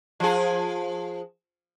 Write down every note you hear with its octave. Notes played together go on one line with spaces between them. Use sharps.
F3 G#4